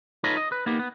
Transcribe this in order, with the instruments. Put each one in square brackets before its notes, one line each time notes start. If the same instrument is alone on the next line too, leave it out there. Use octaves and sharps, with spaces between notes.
[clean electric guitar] D#4 F4 A4 B4 C#5 D#5
D#5
B4
A#3 B3 D#4 G4
B3